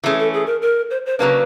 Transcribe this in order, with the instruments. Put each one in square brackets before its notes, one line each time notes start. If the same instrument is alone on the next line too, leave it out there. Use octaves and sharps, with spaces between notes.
[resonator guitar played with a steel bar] E3 A3 C#4 [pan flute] G#4
[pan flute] A4
G#4
A#4
A#4
C5
C5
[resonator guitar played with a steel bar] C#3 F#3 A#3 D4 [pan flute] B4